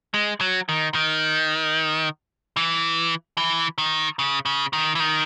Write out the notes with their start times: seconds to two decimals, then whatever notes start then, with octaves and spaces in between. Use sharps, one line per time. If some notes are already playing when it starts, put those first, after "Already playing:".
0.14 G#3
0.41 F#3
0.69 D#3
0.94 D#3
2.57 E3
3.38 E3
3.78 D#3
4.19 C#3
4.46 C#3
4.73 D#3
4.95 E3
5.00 D#3